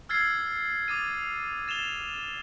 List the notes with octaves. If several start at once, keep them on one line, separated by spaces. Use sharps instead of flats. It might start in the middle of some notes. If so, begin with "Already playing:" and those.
E6 F6 G#6 A6 C7
D6 D#6 A6 D#7
A6 E7 F7 G7